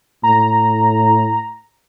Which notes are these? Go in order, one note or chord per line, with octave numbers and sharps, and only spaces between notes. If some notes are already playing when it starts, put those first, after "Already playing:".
A2 A#5